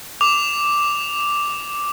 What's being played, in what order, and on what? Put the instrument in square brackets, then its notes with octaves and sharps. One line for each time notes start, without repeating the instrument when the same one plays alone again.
[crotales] D6 F7